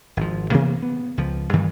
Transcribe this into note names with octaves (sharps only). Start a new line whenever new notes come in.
G#1 F3
C3 E3 A#3 B3
B3
C#2 F3
G2 D#3 E3 G3